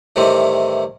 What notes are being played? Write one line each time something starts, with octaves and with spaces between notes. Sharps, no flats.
A2 C3 D#3 E3 G3 C4